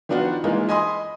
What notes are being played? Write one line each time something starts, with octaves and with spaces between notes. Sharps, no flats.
D#3 F3 B3 D4 F4 F#4
E3 G#3 A#3 D#4 F4
D#5 G#5 B5 C6 D#6